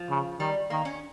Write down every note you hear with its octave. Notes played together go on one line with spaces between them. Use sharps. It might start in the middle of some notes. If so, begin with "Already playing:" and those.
Already playing: F3
C#3
D#3 G3
D#3 A#3
C#4